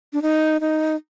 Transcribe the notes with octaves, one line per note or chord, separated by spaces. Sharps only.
D4
D#4
D#4